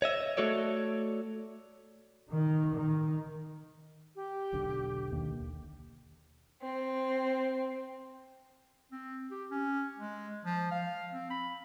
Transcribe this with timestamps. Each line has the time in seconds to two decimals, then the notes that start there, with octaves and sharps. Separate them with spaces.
0.02 C#5 D#5 E5
0.37 A3 F#4 A4 C#5 D5
2.31 D#3
2.75 D#3
4.16 G4
4.53 E1 B1 D3
5.12 D#2
6.61 C4
8.92 C4
9.31 G4
9.51 C#4
9.98 G#3
10.45 F3
10.71 F5
11.12 C4
11.30 B5